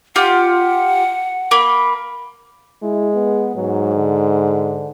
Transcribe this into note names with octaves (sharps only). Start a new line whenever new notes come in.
F4 G4 F#5
A#3 B5
G#3 E4
B3
G#2 F#3
D3